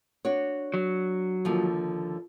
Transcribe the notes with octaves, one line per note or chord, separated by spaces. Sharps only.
D4 F#4 C#5
F#3
D#2 D3 F3